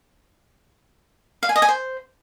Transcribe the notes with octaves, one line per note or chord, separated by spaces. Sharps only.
F5
G#5
D#5
G#5
C5